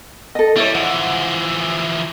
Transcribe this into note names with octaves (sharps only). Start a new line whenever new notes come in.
A4 D#5
G3 E4 C#5
E3 F3 F#5